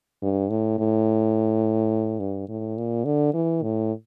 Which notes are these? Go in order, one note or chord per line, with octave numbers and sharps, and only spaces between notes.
G2
A2
A2
G2
A2
A#2
D3
E3
A2